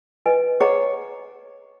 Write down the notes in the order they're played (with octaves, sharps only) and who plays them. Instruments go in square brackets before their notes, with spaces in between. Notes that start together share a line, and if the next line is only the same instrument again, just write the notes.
[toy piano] B4 D#5 G#5
[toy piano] G#4 D#5 F#5 A#5 [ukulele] C#5